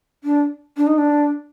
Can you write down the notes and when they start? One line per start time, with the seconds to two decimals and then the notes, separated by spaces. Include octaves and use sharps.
0.24 D4
0.77 D4
0.87 D#4
0.98 D4